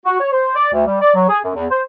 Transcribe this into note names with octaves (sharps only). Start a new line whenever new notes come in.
F#4
C#5
C5
D5
D2
G3
D5
F#3
G#4
F#2
E2
C5